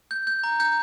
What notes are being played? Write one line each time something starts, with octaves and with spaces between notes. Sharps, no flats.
G6
G6
A#5
G6